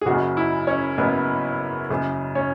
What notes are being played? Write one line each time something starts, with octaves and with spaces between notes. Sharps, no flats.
G#4
F#1 F#2 C#3 F#4
E4
C#4 C#5
F#1 F#2 C#3 B3 B4
F#1 F#2 C#3
C#4 C#5